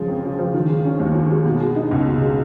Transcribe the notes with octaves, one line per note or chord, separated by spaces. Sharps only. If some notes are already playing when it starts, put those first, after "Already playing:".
Already playing: C#3 F3 G#3
F2
C#3
F3
D#3
G#3
C#4
D#2
D#3
G#3
B2
G#3
D#4
C#2
B2
G#3